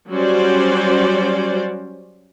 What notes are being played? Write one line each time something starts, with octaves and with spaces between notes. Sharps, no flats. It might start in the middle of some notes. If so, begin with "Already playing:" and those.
F#3 G3 C#4 F#4 C5 D5